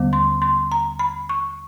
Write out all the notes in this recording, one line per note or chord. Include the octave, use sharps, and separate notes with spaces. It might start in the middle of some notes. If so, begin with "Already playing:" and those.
Already playing: D#2 D3 G3 B3
C6
C6
A#5
B5
C#6